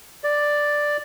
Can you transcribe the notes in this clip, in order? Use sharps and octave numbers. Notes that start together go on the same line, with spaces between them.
D5